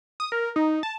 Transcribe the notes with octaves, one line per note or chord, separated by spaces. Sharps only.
D#6
A#4
D#4
A5